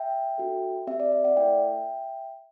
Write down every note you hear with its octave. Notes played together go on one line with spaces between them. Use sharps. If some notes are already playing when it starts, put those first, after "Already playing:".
Already playing: E5 G5
D4 F#4 A4
C4 G4 E5
D5
E5
D5 F#5
A3 E4 A4 E5 G5